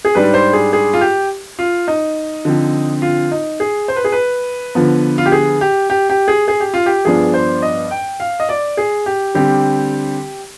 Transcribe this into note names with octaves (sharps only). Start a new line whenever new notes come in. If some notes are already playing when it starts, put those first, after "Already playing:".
G#4
G#2 G3 D4 B4
C5
G#4
G#4
F4
G4
F4
D#4
D3 F3 C4
F4
D#4
G#4
C5
B4
G#4
B4
D3 F3 B3
F4
G4
G#4
G4
G4
G4
G#4
G#4
G4
F4
G4
G2 F3 B3 D4 G#4
C5
D#5
G5
F5
D#5
D5
G#4
G4
D3 G3 C4 G4